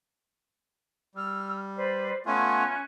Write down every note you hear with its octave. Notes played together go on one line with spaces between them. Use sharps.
G3 E6 F6
B4 C5 D5
A3 B3 C#4 F4 G#5 F#6